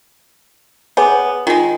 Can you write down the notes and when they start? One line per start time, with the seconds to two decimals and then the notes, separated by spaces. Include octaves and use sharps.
0.97 B3 G#4 C#5 G#5
1.47 D#3 G#3 F4